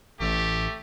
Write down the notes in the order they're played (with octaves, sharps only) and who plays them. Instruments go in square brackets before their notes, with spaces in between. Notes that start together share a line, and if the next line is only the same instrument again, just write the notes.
[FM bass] A1 [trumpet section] A3 G4